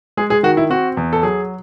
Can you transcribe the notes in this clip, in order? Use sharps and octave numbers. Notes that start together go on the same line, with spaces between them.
G#3 G#4
G#4
D#3 F#4
E4
C4 F#4
E2
A4
F#3 G#4